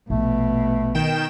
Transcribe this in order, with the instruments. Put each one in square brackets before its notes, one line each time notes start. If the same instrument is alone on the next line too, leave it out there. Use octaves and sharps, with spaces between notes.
[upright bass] A#1 [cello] B2 [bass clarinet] A3
[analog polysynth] D#3 G5 E7